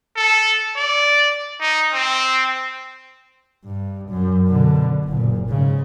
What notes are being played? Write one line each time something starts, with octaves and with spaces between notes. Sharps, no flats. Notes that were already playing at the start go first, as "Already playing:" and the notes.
A4
D5
D#4
C4
G2
F#2
B2 D3
F#1 A#2
G#2 C#3